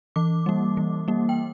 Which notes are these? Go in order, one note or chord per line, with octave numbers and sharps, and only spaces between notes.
E3 D6
G3 A#3
E3
G3 A#3
G5